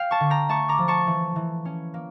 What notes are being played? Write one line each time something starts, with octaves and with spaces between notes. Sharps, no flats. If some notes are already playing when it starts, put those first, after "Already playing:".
Already playing: F5 G5
A5 C#6
D3
G5 A#5
A3 A5 C#6
A#5 D6
F3
A5 C#6
E3
E3
C#4
A#3